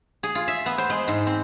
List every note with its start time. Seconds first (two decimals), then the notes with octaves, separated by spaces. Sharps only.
0.23 G#4
0.35 F4
0.48 E5
0.66 B3
0.78 C5
0.90 G#3
1.08 G#2
1.27 C4